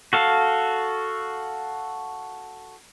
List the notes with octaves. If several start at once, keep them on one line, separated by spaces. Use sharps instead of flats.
F#4 A4 F5